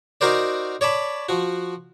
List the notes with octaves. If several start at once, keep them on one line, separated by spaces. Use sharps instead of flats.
D#4 F#4 A#4 C5 D5
C#5 D5 A5 B5
F3 F#4